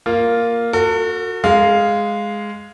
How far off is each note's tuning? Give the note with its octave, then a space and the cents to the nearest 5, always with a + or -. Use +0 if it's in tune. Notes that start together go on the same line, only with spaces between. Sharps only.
A#3 +0 F4 +0
F#4 -15 A4 +45
G#3 +0 F5 +0